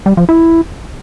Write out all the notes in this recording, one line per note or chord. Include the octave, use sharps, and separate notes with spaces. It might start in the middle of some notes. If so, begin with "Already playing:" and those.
G3
F3
E4